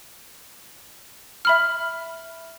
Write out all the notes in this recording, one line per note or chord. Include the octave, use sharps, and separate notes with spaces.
E5 B5 F6